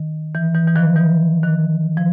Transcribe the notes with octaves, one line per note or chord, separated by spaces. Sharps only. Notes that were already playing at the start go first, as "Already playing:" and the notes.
Already playing: D#3
E3
E3
E3
D#3 F3
E3
D#3
F3